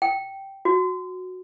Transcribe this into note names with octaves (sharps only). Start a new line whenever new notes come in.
G5
F#4